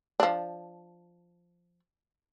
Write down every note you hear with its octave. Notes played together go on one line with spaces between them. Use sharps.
F3 D4